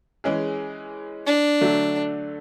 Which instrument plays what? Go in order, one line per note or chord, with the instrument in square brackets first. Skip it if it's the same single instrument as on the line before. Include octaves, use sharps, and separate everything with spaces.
[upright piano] E3 G#3 C#4 G#4
[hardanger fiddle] D4
[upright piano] D3 F#3 A3